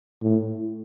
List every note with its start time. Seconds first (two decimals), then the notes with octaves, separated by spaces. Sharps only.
0.22 A2